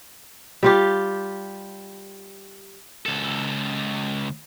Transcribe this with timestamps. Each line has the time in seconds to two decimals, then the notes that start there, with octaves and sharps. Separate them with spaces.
0.63 G3 F4 G4
3.06 C#2 A4